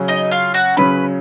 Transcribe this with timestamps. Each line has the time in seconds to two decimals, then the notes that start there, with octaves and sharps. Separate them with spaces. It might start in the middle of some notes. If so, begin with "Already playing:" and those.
Already playing: C#3 F#3 C#4
0.08 D#4 D#5
0.31 F4 F5
0.54 F#4 F#5
0.77 C#3 F#3 C#4 B4 B5